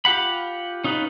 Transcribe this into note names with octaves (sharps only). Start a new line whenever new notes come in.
F4 G4 F#5 B5
C#4 D#4 F4 B4